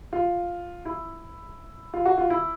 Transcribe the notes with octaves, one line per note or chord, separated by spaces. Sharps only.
F4
E4
F4
F#4
F4
E4